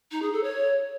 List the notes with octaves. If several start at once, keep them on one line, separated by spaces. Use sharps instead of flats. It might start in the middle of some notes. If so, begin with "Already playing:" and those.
D#4
G#4
A4
C#5